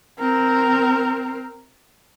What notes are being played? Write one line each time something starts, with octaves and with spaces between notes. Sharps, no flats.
C4 A#4